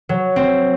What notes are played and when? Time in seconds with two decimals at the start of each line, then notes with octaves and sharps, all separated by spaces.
0.09 F#3
0.36 C4